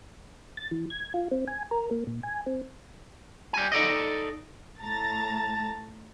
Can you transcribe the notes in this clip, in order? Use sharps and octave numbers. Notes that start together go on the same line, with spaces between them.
A6
E3
G#6
F4
C4
G#5
A#4
A#3
A#2
G#5
C4
G3 G#5
D#4 A4 D5 D#5
A2 A5 A#5 A6